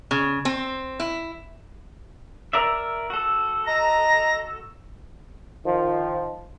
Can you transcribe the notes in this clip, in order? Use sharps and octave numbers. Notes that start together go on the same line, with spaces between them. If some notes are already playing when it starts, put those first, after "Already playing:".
C#3
C4
E4
A#4 D5 E5
F#4 A4
D#5 A#5
D#3 F3